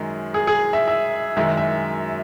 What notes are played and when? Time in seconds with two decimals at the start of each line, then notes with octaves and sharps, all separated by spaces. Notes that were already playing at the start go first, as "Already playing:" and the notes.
Already playing: F#2 D#3 G#3
0.34 G#4
0.47 G#4
0.73 E5
0.88 E5
1.36 F#2 D#3 G#3 E5
1.57 E5